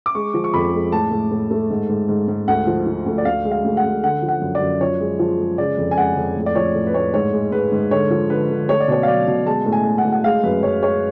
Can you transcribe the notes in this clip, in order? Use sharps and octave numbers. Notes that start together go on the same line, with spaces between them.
D6
G#3 C#6
F3
C#6
F2 B5
G#3
A2 A5
A2
A2
A3
G#2
G#2
G#2
G#2
D2 F#5
F3
F3
D2
D5
D2 F5
G#3
F5
D2
F#5
D2
D3 F#5
F3
F#5
F#2
D5
F#2
F3 C#5
G#3
F3
G#3
C#3 D5
F2
G#5
G#3 F#5
F2
A2
D5
F3 C#5
A2
B4
A2 C#5
G#2 C#5
G#3
G#2 B4
G#2
D3 C#5
F3
D3 B4
D3
A3 C#5
D5
B2 C#5
F5
F#3 D5
B2
G#3 A5
A2
G#5
G#3
F#5
A2
F#5
G#3 F5
F#2 B4
F#2 C#5
G#3 C#5